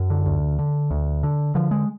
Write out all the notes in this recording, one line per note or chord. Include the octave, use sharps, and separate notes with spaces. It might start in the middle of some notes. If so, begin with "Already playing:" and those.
Already playing: F#2
D3
D2
D3
D2
D3
D3 F3
G#3